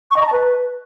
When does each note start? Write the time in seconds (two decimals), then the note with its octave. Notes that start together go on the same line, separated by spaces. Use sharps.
0.11 C#6
0.16 D#5
0.22 A#5
0.27 A5
0.32 B4